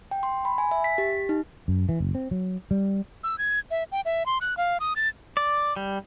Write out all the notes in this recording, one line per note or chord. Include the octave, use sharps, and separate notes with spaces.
G5
C6
B5
G#5
E5
B6
G4
D#4
F#2
E3
F#1
C4
F#3
G3
E6
G#6
E5
G5
E5
C6
F#6
F5
D#6
A6
D5
G3